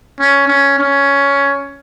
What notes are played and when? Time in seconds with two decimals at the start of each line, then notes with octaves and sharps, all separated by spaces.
0.20 C#4
0.48 C#4
0.79 C#4